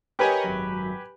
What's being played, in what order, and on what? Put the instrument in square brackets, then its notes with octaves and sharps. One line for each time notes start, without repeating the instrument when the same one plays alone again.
[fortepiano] G4 B4 G#5 [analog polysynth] A#4 C#5 D#5
[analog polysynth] G#1 F#2 F#3